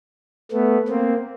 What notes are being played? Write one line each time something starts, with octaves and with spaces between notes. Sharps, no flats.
A3 B3
A#3 C4